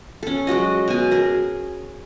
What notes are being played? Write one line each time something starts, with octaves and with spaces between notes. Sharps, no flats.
C#4 A4
F#3 G#3 F#4 D#5
B2 G#5
G#4 A#4